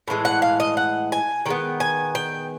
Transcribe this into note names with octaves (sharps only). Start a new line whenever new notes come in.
A2 E3 G#3
F#5
F5
D#5
F#5
G#5
D#3 G#3 B3 G5
G#5
G5